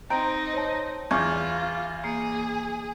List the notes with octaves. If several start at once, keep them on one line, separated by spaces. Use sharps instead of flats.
C4 D#4 A#5 G6 D7
C5 C#5 A5
E2 E3 F4 C#6 D6 F6 G6 G#6
A#3 G#4 C7